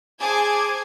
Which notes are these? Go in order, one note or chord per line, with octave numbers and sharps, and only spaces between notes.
G#4 C5 G#5 A5 D6 G#6